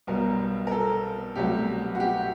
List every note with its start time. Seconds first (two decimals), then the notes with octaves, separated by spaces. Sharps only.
0.07 B1 B2 G3 A#4
0.67 A#4
0.71 A4
1.35 C2 B2 F#3 A3 G4
1.95 F#4
2.00 G4